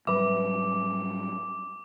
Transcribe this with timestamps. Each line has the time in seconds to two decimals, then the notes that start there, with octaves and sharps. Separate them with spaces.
0.07 G#2 F#3 G3 B4 E5 D6